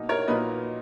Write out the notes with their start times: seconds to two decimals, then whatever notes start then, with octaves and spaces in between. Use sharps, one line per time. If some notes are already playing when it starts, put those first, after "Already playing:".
Already playing: B2 A#3 D#4
0.09 A#4 C#5
0.28 A#2 F#3 A#3 D#4 B4 D#5